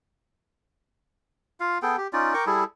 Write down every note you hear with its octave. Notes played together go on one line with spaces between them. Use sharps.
F4 F5
B3 G#4 A4 G5
G4
C#4 D#4 F4 D5
A#4 G5 C#6 D6
G3 E4 G#4 A4